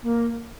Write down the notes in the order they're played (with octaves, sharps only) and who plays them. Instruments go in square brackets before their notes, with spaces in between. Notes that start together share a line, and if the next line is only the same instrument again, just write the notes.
[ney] A#3